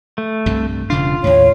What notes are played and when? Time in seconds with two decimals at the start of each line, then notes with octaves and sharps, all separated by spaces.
0.18 A3
0.46 C2 G2 C3
0.90 E1 C#3 D4 F4
1.24 D#2 A2 C#5